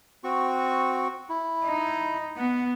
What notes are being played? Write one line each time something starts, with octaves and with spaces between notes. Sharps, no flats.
C4 F#4 C#6
E4
D#4
B3 F#5